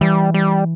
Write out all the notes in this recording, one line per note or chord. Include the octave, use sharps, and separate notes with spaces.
E3 G3
G3